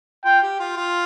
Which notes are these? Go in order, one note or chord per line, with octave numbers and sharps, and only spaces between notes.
F4 G5
G4
F4
F4